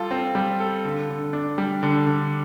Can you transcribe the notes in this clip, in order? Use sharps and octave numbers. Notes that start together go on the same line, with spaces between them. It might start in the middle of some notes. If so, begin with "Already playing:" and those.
Already playing: G3 F4 A4
C4
G3
A4
D3
D3
D4
G3
D3
D3